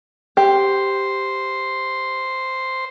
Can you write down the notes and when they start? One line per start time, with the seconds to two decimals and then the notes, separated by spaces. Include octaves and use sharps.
0.37 G4 C5